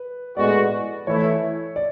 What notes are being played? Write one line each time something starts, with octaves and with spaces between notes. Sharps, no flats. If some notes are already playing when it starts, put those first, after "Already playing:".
Already playing: B4
A2 G#3 B3 F#4 D5
E3 A3 E4 C#5
D5